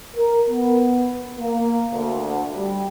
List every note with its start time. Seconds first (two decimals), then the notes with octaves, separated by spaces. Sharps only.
0.17 A#4
0.50 B3
1.40 A#3
1.91 D2
2.52 G3